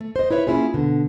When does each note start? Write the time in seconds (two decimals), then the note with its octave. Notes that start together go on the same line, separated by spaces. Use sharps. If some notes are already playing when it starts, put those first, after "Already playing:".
0.01 A3
0.16 C5 D#5
0.31 E4 B4 C#5 E5
0.47 A#3 C#4 D4 E4 F4 G#4
0.74 B2 D3